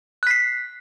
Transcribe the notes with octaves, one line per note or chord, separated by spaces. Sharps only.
F#6 B6 C7